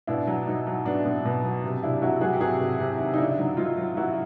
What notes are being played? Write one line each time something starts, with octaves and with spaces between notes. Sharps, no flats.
B2 D4 E4
F#3
F#3 D#4
F#3
B2 D4
B2
B2
F#3
C3
C3 D4 E4
F#3 E4 F#4
F#3 F#4 G#4
G4
C3 F#4 G#4
C3
C3
D#3
D#4
C#3 D4 E4
F#3
F#3 D#4 F4
F#3
F#3 E4 F#4